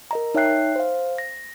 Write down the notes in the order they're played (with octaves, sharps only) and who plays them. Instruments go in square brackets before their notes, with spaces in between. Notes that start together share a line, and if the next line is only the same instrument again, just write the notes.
[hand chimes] A#4 D#5 A#5
D#4 C#5 E5 G5 F#6 C7
C5 F5
A#6